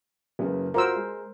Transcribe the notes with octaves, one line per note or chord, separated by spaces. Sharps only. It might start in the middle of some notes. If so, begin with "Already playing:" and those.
F#1 C#3 B3
F4 F#4 A#4 C5 E6
G#3